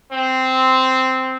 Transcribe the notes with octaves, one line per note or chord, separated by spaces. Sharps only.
C4